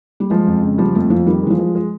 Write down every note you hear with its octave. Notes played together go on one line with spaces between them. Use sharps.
G3
F3 G#3
F2
C#3
F3 G3
F2 A3
F2 F3
D#3 G3
E3 G#3
F3
G#3
G#3